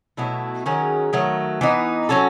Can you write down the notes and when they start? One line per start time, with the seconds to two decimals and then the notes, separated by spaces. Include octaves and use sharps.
0.17 B2 F#3 A3 E4
0.66 D#3 F#3 C#4 G#4
1.13 D#3 F#3 A3
1.61 E3 B3 D#4
2.09 F#3 C#4 F#4 A4